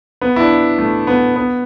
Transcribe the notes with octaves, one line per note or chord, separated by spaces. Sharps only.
B3
E4
D4
A3
B3
B3